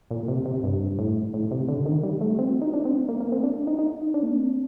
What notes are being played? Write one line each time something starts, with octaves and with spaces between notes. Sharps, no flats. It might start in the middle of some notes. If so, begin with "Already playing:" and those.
A#2
C3
C3
G2
A2
A2
C3
D3
D#3
G3
A3
C4
F#4
D#4
D4
C4
A#3
A#3
C4
D4
D#4
D#4
D4
A#3
C4